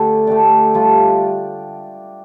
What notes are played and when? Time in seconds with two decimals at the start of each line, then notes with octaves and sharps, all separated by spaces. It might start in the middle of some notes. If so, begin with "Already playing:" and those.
Already playing: D3 A3 D4 G4
0.27 A3 D4 G4 D5
0.74 G3 D4 F4